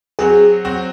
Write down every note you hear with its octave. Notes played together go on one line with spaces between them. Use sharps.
F#3 C4 F#4 G#4
F#3 C4 F#4